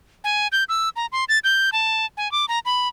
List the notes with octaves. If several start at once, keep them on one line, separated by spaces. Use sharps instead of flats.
G#5
G6
E6
A#5
C6
A6
G6
A5
G#5
D6
A#5
B5